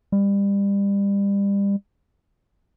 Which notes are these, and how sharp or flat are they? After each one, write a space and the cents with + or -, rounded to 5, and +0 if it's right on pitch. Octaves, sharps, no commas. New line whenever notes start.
G3 +30